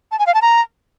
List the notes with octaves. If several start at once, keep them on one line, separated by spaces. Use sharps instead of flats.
A5
G#5
F5
A5
A#5